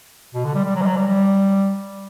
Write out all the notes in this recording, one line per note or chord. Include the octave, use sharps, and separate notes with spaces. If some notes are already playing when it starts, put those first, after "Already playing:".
B2
D3
G3
G3
F#3
G3
F#3
G3
G3